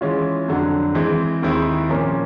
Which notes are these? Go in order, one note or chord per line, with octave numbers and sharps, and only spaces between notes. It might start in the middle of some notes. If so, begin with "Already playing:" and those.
E3 G#3 C#4 F4
F2 D3 F#3
E3 G#3 C4
D#2 D#3 G#3 C4 E4
A#2 F3 A#3 C#4